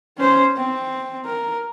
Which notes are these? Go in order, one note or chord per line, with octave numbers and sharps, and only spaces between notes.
C#4 C5
C4
A#4